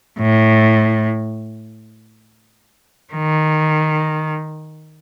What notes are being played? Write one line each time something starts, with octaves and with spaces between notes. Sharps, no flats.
A2
D#3